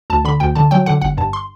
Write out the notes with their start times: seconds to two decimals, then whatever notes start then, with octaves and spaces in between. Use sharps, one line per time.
0.10 D2 A5
0.25 D3 B5
0.40 D2 G5
0.55 D3 A5
0.71 F#3 G5
0.86 D3 F#5
1.01 G1 F#5
1.17 G2 A5
1.33 C6